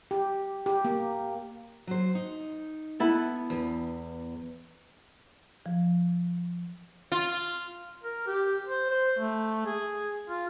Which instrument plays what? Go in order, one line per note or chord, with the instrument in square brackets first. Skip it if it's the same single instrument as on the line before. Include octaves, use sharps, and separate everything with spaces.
[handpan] G4
G4
A#3
[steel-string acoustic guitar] F#3 C5
D#4
[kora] B3 E4 A4
[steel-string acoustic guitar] E2
[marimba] F3
[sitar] F4
[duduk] A#4
G4
C5
C5
A3
G#4
F4